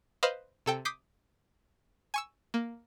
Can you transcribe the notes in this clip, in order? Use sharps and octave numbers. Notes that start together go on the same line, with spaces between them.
B4 C5 D#5 F5 B5
C3 A4 G5
D6 D#6 G6 B6 C7
G#5 C#6 E6
A#3